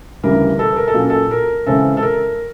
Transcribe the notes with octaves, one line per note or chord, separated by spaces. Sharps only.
D2 C#3 E3 G3 A#4
A4 B4
A#4
A4
A#2 F#3 A#3 C#4
A4
A#4
C#3 E3 G#3 C4 A4
A4
A#4